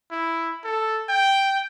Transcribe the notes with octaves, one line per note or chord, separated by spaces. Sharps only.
E4
A4
G5